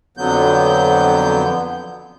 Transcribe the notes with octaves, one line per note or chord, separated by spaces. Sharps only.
F2 D3 F#3 B3 G6